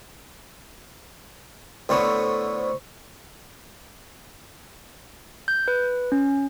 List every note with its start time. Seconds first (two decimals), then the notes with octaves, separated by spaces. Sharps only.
1.89 A2 D3 B3 C5 C#6
5.48 G6
5.68 B4
6.12 C#4